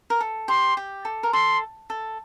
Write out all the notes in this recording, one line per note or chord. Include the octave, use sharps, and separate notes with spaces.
A#4
A4
G4 C6
G4
A4
A#4
A4 C6
A4